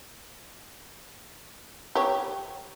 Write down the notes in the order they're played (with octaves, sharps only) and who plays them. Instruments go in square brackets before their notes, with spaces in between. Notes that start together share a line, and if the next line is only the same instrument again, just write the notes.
[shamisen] G4 C#5